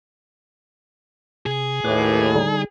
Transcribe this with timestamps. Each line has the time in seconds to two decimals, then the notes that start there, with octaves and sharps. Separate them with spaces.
1.46 C3 G#4
1.85 D#2 A2 B4 D6
2.36 D3 G3 D#4